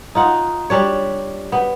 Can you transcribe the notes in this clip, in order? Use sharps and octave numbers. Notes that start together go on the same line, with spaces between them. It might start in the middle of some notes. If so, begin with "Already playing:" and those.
D#4 F4 F#5
G3 D4 C#5
B3